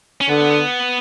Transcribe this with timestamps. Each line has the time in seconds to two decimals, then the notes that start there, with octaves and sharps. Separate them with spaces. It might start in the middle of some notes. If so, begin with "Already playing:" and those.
0.21 C#4
0.29 D3 B3